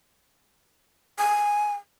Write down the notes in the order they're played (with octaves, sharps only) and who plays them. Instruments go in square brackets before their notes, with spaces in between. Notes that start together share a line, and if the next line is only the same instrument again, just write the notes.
[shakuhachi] G#5